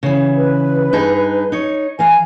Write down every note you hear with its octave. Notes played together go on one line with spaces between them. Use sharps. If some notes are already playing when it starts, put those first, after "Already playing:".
C#3 E3
B4
G2 D#4 G#4
D#4 C#5
E3 F5 G#5